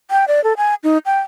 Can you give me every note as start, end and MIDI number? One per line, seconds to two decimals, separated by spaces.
0.11 0.25 79
0.28 0.43 74
0.44 0.53 69
0.57 0.75 80
0.84 0.98 63
1.06 1.20 79